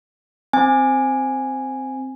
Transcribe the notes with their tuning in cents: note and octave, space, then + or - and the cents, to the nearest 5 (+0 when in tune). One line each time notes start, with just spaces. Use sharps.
C4 +0 G#5 -5